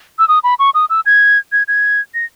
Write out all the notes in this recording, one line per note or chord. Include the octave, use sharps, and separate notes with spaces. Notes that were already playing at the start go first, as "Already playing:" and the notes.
E6
D#6
B5
C#6
D#6
E6
G#6
G#6
G#6
A#6